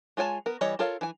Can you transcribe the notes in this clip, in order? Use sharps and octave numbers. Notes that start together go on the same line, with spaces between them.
G#3 F4 C#5 G#5 A5
B3 A#4
E3 G3 C#5 D#5
F4 A4 A#4 C#5 F5
E3 G#5